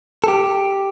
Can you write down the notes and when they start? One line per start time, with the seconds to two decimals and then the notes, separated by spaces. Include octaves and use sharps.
0.24 A4
0.28 G4